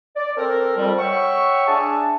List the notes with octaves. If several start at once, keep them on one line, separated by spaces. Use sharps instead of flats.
D5
C4 A4 A#4
F2 G3
C#5 E5 F#5 G5 C#6
D4 G#4 E5 A5